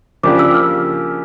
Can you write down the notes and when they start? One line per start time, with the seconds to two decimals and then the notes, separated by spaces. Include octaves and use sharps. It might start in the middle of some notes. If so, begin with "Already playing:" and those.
0.23 C#3 F3 A#3 D4 G4 D6
0.39 E6
0.54 F6